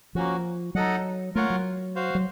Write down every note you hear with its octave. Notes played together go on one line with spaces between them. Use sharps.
F3 A#3 C#4 F#4
F#3 D#4 A4 D#5 F#5
A3 F4 A#4 C#5 F#5
F#3
F#4 C5 F5
F#3